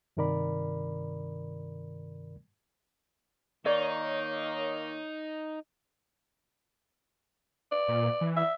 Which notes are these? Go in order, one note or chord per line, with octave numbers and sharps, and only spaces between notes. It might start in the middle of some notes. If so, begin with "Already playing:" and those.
G2 C3 D#3 A#4 D5 B5
D#3 A#3 D#4 C#5 D5
D5
A#2
E3
E5